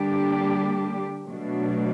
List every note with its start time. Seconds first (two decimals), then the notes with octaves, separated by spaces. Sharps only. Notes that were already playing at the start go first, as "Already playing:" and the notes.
Already playing: D3 G3 A#3 D4 G4
1.28 B2 F#3 A3 D4